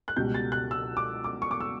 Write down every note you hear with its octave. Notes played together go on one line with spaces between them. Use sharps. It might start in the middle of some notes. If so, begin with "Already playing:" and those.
F#6
C#2 B2 G3 G6
A6
F#6
E6
D6
D6
C#6
D6
E6